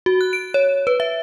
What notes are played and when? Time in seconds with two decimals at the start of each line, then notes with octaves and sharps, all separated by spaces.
0.06 F#4
0.21 F#6
0.33 D7
0.54 C#5
0.87 B4
1.00 E5